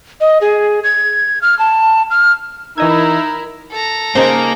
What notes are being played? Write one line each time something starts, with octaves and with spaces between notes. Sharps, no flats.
D#5
G#4
G#6
F6
A5
F6
E3 D#4 E4 A#4 D#5 E6 G#6
A4 A#5
C#3 A#3 D#4 C5